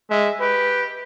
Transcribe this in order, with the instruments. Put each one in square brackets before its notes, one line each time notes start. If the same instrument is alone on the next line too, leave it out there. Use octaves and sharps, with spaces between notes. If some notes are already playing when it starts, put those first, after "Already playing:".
[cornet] G#3 [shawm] E5
[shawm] G4 [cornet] B4